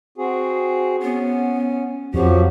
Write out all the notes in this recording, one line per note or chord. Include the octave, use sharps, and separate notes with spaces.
C4 F#4 G#4
B3 C#4
F2 F3 F#3 F#4 G4